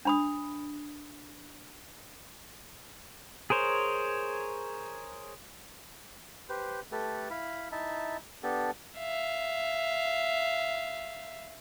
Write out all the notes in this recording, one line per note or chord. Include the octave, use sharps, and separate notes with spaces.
D4 B5 D#6
G#4 A#4 C5 C#5
G4 B4 C5
A3 G4 A4 B4
E4 F5 B5
D#4 E4 E5 A5
B3 D4 G4 A4
E5 F5